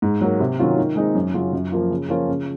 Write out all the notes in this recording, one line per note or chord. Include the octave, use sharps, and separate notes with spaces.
G#2
F#3 A#3
C3
D#3 F#3 C#4 F4
D#3
G#3 C4 D#4
F#2
C#3 F#3 C#4 F4
F#2
F3 A#3 F4
C#3
F3 A#3 C#4 F4
C#3